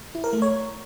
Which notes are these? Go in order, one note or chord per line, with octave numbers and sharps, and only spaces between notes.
E4
A#4
A3
C#5